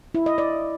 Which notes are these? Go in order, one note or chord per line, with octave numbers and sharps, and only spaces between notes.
E4
D#5
D5